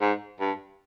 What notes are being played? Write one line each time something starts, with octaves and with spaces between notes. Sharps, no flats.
G#2
G2